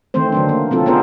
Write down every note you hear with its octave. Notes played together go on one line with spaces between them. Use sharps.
D#3 E3 A3 C4 C5
D3 F#3 D4
A#3
C3 F#3 C4 F4 A4
B3 D4 F4 G#4 A#4 C5